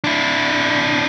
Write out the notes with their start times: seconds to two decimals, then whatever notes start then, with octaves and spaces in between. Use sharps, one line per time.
0.04 D4 E4